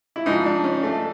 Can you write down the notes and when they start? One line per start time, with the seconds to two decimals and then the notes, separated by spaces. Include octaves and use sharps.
0.16 E4
0.26 G#2 F3 D#4
0.46 D4
0.64 C#4
0.83 A3